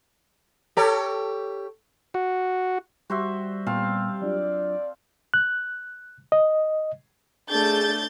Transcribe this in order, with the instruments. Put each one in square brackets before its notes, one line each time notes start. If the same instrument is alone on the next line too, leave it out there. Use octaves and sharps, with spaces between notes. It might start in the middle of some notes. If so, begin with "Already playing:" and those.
[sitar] G4 A4 C#5
[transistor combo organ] F#4
[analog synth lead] G3 [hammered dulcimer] F#4 C5 E5
[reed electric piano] A#2 B3 [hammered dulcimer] C4 F5 A5
[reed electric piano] F#3 D4 F4 [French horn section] D5
[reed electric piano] F#6
D#5
[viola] A3 D4 [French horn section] G#4 [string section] G6 A6